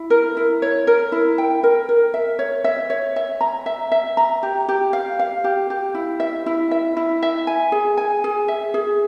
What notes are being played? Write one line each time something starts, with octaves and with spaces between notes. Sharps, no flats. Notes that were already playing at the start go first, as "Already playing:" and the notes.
Already playing: E4
A#4
E4
C#5
A#4
E4
G5
A#4
A#4
E5
C#5
E5
C#5
E5
A#5
E5
E5
A#5
G4
G4
F5
F5
G4
G4
E4
E5
E4
E5
E4
E5
G#5
G#4
G#5
G#4
E5
G#4